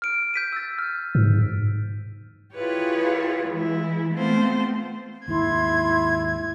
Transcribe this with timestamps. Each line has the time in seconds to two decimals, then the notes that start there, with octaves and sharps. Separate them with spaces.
0.02 F6 D7
0.34 G6 B6 D#7
0.52 E6 A6
0.78 F6
1.15 G#2
2.54 E4 F4 G4 G#4 B4 C#5
3.48 E3 G#3 E4
4.13 A3 B3 C4 F4 C5
5.28 D#2 G#2 E4 C6 G#6